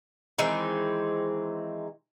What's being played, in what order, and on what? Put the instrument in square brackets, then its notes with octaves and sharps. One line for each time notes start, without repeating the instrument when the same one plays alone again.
[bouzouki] D#3 E3 G#3 C4